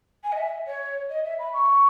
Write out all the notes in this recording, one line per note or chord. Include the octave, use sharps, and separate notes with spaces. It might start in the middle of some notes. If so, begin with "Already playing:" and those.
G#5
D#5
E5
C#5
D#5
E5
B5
C#6